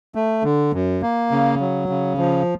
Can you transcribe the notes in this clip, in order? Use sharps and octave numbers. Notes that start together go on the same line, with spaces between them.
A3
D3
F#2
A#3
C#3
F#3
C#3
F3